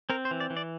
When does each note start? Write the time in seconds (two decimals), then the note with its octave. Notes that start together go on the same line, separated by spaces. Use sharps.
0.10 C4 A#4
0.25 C5
0.31 E3
0.40 D5
0.50 E3
0.57 D5